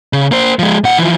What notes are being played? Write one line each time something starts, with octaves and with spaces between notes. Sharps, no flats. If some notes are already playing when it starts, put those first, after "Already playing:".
C#3
A#3 C5
F3 G#3
A#2 F#5
E3 F3